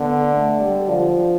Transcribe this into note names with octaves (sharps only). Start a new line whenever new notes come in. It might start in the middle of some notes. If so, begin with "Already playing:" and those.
Already playing: D3 B3
A3
G3
D3 F3